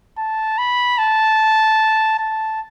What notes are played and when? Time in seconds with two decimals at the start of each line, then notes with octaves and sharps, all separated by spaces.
0.18 A5
0.58 B5
0.98 A5
2.19 A5